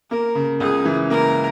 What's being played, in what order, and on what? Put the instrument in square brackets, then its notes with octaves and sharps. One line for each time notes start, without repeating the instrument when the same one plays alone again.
[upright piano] A#3 [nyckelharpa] A#4
[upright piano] C#3
[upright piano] C#2 [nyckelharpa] G#4
[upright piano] E3
[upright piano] A#3 [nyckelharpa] A#4